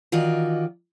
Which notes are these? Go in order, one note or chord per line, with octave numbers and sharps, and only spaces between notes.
D#3 E3 F4 F#4 D5 D#5